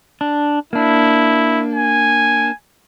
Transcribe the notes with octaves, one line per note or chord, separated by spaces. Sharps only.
D4
A#3 D4 E4
G#5